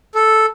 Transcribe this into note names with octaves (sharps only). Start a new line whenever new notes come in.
A4